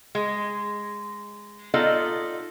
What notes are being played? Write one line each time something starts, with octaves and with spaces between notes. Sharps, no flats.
G#3
B3 D#4 F4 A4 D5 D#5